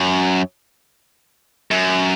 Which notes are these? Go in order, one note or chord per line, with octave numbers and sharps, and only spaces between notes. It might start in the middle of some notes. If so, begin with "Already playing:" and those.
Already playing: F#2
F#2